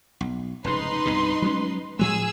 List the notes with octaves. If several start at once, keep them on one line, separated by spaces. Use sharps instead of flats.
B1
F1 G#2 C#3 D#4 B4 C6
C2 G2 B2
F#3 G#3 C#4
A2 F3 G#3 G#4 E6